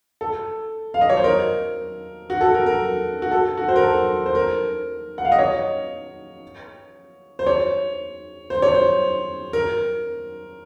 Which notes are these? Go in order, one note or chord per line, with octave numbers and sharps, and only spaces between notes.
A4
F5
D#5
C#5
C5
A#4
F#4
A4
A#4
A#4
F#4
A4
F#4
C5
A#4
A4
C5
A#4
F#5
F5
D#5
C#5
C5
C#5
C5
C#5
C5
A#4